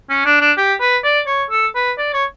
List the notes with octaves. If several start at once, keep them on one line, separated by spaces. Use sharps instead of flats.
C#4
D4
D4
G4
B4
D5
C#5
A4
B4
D5
C#5